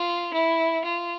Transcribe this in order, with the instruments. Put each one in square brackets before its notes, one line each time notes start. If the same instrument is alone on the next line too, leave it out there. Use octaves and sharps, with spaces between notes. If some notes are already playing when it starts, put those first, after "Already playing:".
Already playing: [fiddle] F4
E4
F4